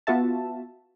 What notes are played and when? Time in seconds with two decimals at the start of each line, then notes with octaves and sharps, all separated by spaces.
0.07 B3 F4 F#4 E5 A5